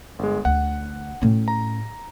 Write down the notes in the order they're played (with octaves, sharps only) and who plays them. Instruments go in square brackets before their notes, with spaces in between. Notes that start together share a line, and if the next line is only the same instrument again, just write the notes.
[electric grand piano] G1 G#3
[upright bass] D2 [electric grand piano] F#5
[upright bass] A2 C#4
[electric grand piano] A#5